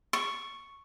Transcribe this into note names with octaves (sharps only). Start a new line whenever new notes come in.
C#6